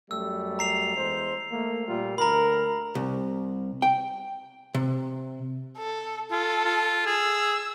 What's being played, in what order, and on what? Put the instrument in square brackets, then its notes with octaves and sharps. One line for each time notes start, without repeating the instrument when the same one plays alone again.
[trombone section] F#2 G3 A3 [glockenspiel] E6
[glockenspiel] A#5 C7 F7
[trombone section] E2 G#3 C5
A3 A#3
A#2 G3 F4
[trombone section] D2 A#4 [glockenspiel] A#5 B5
[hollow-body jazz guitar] C2
G5
C3
[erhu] A4
[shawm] F4 [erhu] A4
[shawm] F4
[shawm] G#4 [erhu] E6